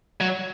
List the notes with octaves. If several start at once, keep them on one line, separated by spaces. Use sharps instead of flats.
F#3